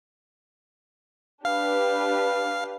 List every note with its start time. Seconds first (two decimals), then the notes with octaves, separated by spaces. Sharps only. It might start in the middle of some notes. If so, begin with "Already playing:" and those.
1.45 D4 G4 B4 F5